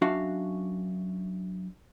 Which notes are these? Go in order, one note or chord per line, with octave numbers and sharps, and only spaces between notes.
F#2 D4 F#4 E5 F5